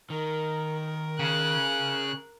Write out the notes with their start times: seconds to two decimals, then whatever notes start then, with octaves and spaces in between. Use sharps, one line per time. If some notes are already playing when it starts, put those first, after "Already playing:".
0.10 D#3 A#4
1.20 C#3 F#6